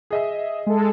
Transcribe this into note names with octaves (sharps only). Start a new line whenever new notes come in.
G#4 D#5 E5
G#3 A4